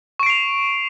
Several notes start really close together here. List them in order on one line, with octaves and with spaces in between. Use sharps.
C#6 D7 C7 F7